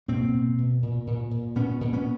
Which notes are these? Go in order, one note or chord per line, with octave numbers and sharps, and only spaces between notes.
B2 A#3 C4
B2
B2
A#2
A#2
A#2
A#2 B3 C#4
A#2
B3 C#4